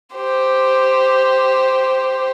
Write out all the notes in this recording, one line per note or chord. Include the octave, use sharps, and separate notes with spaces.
G4 C5